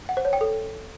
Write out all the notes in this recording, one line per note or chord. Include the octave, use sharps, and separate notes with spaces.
F#5
C5
C#5
G5
A4